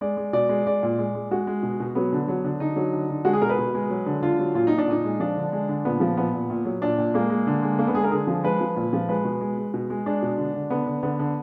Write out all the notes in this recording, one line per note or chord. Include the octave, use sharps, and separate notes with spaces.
G#3 D5
G#3
B2 D5
G#3
G#3 D5
A#2
G#3
G#3
G#3 F#4
G#3
B2
B2
F#3 B3
D3
F#3
D3
D3 D#4
F#3
D3
D3
G#3 F#4
G#4
B2 A#4
B4
B2
G#3
F#3
D3
D3 F4
F#3
A#2 F4
A#2 D#4
D4
A#2 D#4
G#3
F3 D4
D3
G#3
D3
A#2 B3
F3
A#2 B3
A#2
A#2
F#3
A#2 D4
A#2
G#3 A#3
G#3
D3
G#3
D3 A#3
B3
G#3 G#4
A#4
D3 G#4
F3
G#3 B4
F3
A#2
F3
G#3 B4
B2
G#3
G#3
B2
G#3
G#3 D4
B2
D3
D3
D3 B3
D3
D3 B3
D3